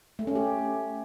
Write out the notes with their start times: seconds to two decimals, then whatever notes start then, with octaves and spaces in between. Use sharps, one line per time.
0.19 A3
0.27 C#4
0.35 G4